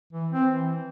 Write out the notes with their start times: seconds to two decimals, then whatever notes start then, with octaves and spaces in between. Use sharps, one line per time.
0.13 E3
0.32 C4
0.51 E3